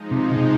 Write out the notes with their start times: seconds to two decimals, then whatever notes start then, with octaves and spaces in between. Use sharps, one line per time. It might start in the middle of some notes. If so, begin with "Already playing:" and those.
Already playing: F3 G#3 D#4
0.11 C3
0.36 C3